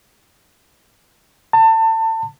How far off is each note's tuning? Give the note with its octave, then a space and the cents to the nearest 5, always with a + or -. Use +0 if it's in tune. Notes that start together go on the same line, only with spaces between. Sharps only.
A5 +30